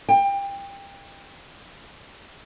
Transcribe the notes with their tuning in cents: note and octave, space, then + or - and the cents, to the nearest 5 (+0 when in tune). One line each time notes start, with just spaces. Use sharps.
G5 +25